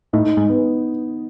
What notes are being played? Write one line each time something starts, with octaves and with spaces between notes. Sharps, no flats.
A2 D#4
G#2
B3